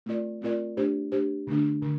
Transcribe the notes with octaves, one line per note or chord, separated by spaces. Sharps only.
A3 C4 F4 A#4 D5
A3 C4 F4 A#4 D5
A3 D4 G4 C5
A3 D4 G4 C5
D3 A3 D4
D3